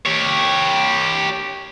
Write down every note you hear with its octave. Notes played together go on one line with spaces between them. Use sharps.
G4 C#5